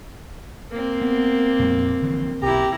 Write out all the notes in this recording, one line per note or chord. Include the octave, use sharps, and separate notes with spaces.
A#3 C4
B3
F2 A#2 G3
D3 E3 F3
B1 E4 G4 A#5